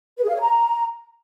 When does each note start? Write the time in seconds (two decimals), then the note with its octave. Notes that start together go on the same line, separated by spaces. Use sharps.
0.18 B4
0.23 G#4
0.29 F5
0.35 C#5
0.40 A#5